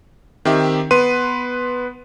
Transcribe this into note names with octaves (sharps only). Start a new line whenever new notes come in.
D#3 C4 G4 E5
B3 B4 C6 D#7